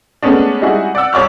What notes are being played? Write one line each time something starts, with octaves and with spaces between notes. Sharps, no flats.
G#3 A3 B3 C#4 D4
G3 G#3 D#4 E4 F#4 G#4
D5 F#5 E6
C2 C#5 D5 C#6 F6